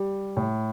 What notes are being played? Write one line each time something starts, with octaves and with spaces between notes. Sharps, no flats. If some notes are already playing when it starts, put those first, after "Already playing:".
Already playing: G3
A2